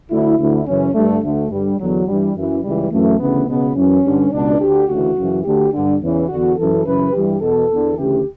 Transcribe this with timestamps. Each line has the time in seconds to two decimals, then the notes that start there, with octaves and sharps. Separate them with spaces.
0.10 D2 D3 E4
0.38 D2 D3 E4
0.67 F#2 C#3 E3 C#4
0.94 G2 D3 A3
1.23 D2 D3 A3
1.50 G2 D3 G3
1.79 E2 D3 F#3
2.07 G2 E3 G3
2.36 F#2 E3
2.63 C#2 C#3 E3 G3
2.91 F#2 E3 A3
3.19 D2 C#3 E3 B3
3.48 C#2 B2 B3
3.76 F#2 E3 C#4
4.04 G2 D3
4.32 C#2 B2 D4
4.60 D2 D3 G4
4.88 D2 C#3 E3 F#4
5.16 F#2 C#3 E3
5.44 D2 D3 G4
5.72 G2 D3
6.00 E2 C#3 E3
6.28 E2 D3 F#4
6.57 F#2 E3 A4
6.85 F#2 C#3 E3 B4
7.13 G2 E3 G4
7.41 E2 B2 A4
7.70 E2 D3
7.97 D2 C#3 E3 G4